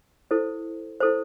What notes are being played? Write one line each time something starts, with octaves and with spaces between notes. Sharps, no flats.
E4 A4 C5
E4 A4 C5